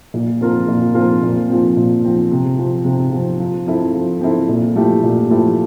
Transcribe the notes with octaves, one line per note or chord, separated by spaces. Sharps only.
A#2
F3 C4 F4 A#4
A#2
F3 C4 F4 A#4
A#2
F3 C4
A#2
F3 C4
C3
F3 C4
C3
F3 C4
F3
C4 E4 A4
F3
C4 E4 A4
A#2
F3 A3 E4 G4
A#2
F3 A3 E4 G4